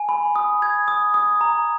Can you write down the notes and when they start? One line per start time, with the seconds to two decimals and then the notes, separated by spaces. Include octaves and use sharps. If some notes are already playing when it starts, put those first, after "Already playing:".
Already playing: G#5
0.09 B5
0.36 D#6
0.62 G#6
0.88 D#6
1.14 D#6
1.41 A#5